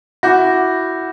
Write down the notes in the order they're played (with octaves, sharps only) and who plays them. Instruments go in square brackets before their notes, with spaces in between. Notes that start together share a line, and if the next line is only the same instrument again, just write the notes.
[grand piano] E4 F#4 [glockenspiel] D6 G6 A#6